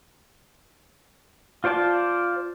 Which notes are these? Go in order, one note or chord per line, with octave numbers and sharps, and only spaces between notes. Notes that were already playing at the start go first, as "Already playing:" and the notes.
F4 C5 D5 A5